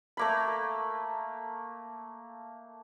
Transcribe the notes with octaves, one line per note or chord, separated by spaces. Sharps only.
A3 A#3 B5